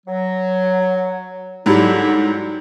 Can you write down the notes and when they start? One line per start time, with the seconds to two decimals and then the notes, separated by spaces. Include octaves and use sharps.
0.06 F#3
1.66 G#2 D3 F#3 G3 E4